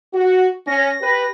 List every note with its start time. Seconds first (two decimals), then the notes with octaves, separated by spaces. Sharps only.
0.14 F#4
0.67 C#4 A#6
1.01 G4 B4